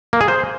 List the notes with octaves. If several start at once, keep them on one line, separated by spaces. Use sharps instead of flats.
A#3
G#4
C5